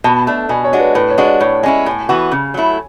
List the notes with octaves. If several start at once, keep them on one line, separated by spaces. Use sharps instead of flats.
B2 A5
A3 D4
B2 G#5
C#5
G#3 D4 F#4
B4
A2 B4
C#5
G#3 D4 F#4
D5
A2 C#5
G#3 C#4 E4 G#5
A2 G#5
E3 B3 F#4
C#3
F#3 A3 E4